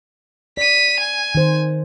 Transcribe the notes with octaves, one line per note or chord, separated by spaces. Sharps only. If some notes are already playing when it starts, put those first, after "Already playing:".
D5 B6 D#7
G#5
D#3 C5